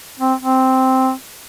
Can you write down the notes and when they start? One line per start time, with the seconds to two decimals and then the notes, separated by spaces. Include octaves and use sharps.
0.20 C4
0.40 C4